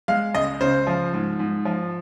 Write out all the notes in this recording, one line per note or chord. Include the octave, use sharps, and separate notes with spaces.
G#3 F5
C#2 D#5
C#3 C5
F3
G#2
G#2
F3